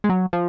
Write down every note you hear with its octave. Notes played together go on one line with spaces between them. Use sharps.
G#3
F#3
F3